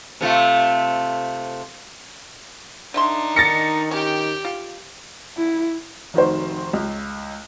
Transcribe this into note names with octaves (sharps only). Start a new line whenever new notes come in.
C3 A3 F4
D3 D4 D#4 E5 C6
D#3 A6 A#6 C#7
C#4 G4 G5
F4
E4
F1 D#3 F#4 C5
C#2